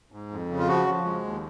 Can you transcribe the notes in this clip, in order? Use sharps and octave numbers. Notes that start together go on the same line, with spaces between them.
G#2
F2
C#3
F4
F3 F#4
F3
G#3
D#2